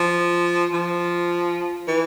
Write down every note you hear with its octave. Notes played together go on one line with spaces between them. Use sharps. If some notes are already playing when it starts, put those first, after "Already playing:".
Already playing: F3
F3
E3